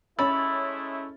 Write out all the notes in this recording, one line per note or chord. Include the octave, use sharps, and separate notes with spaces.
G#3 A3 C#4 E4 C#5 B5 E6 A6